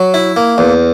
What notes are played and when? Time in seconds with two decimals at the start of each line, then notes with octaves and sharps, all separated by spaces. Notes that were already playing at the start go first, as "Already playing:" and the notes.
Already playing: F#3
0.14 E4
0.37 A#3
0.58 E2